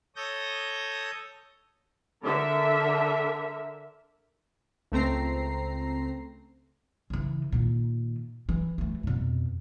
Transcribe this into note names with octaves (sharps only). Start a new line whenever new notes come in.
A4 C#5 D#6 G6 A#6
D3 A#4 E5
C#2 A3 C4 A#5 C7
C#3 E3
A#2 D#3
E3
E3 A3
F2 B2